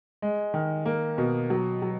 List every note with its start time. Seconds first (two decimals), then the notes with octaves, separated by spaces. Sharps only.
0.22 G#3
0.54 D#3
0.86 A#3
1.18 B2
1.50 F#3
1.82 F#3